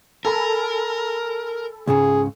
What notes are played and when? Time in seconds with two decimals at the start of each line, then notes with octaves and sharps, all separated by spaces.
0.25 A4 A#4 G#5 B5
1.87 C#2 G#2 C#3 G#4